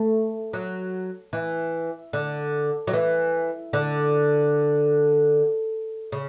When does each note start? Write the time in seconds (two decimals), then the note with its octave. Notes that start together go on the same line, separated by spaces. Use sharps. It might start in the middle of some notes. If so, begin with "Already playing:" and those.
Already playing: A3
0.53 F#3
1.33 E3
2.13 D3
2.87 F#3
2.93 E3
3.73 D3
6.12 C#3